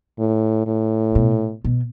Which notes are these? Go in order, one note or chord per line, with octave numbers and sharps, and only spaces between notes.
A2
A2
B2
B2